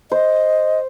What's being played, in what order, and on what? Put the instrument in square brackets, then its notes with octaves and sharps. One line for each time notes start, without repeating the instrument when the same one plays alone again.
[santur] C5 [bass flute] D#5